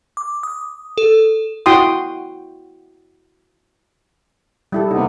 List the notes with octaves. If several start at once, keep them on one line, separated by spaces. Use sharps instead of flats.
D6
D#6
A4
E4 F#4 G5 C6 D#6
G3 E4 A4
D#2 C3 B3 D#4